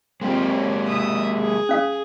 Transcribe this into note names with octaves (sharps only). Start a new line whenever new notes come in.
G#3 A#3 C4 F4 G4
C#5
E5 D#6
G#4
C#4 F5 D#6